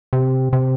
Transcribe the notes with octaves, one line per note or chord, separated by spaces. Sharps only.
C3
C3